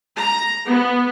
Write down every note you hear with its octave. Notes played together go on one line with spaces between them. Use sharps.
A#5
B3